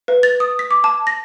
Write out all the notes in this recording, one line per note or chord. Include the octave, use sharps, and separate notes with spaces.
B4
A6
D#6
B6
D6
A5
A#6